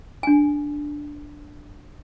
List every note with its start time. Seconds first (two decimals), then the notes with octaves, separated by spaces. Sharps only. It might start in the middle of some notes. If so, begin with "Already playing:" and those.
0.23 D4 G#5